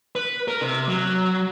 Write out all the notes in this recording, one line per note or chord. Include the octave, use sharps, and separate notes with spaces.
B4
A#4
C3
F#3